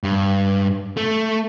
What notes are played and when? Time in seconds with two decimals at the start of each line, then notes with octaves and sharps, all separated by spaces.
0.03 G2
0.97 A3